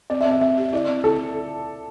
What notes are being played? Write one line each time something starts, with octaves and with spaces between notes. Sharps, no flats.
C4 D5
E5
C4
E5
C4 E5
G4
E4 D5
C4
E4 A4